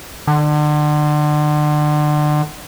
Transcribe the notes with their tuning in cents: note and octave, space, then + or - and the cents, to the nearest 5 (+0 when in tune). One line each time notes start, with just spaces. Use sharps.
D3 +35